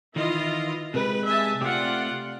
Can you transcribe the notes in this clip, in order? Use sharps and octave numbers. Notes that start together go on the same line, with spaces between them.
D#3 E3 E4 F4 D#5
C3 G#3 B4
E5 G#5 A5
C3 A3 F4 G4 D5 F#5